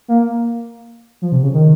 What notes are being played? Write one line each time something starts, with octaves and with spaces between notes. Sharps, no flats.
A#3
F3
C3
C#3
D#3